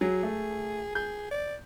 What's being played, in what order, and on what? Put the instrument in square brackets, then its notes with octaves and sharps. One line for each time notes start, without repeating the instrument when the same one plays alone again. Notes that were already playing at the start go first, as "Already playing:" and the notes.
[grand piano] F#3 [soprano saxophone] G#4
[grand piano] A3
[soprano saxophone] G#4 [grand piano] G6
[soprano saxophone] D5